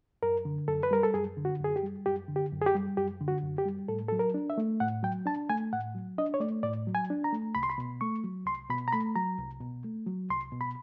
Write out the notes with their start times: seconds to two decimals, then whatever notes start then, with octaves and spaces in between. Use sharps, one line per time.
0.23 F#2 A#4
0.45 D3
0.68 F#2 A4
0.83 B4
0.91 G3 A#4
1.03 A4
1.14 F#2 G#4
1.37 D3
1.45 F#4
1.60 F#2 G#4
1.76 G4
1.83 G3
2.06 F#2 G4
2.29 D3
2.36 G4
2.52 F#2
2.62 G#4
2.66 G4
2.75 G3
2.97 F#2 G4
3.21 D3
3.28 F#4
3.43 F#2
3.58 G4
3.66 G3
3.88 A2 A4
4.08 F#3 A4
4.19 A#4
4.34 D4
4.50 E5
4.58 A3
4.80 A2 F#5
5.03 F#3 G5
5.26 D4 A5
5.49 A3 G#5
5.73 A2 F#5
5.95 F#3
6.18 D4 D#5
6.34 C#5
6.40 A3 D5
6.63 A2 D5
6.87 F#3
6.95 G#5
7.10 D4
7.24 A#5
7.33 A3
7.55 C2 B5
7.63 C6
7.70 B5
7.78 B2
8.01 A3 C#6
8.24 F#3
8.46 C2 C6
8.70 B2 B5
8.88 A#5
8.92 A3 B5
9.16 F#3 A#5
9.38 C2
9.61 B2
9.84 A3
10.06 F#3
10.29 C2 C6
10.52 B2
10.61 B5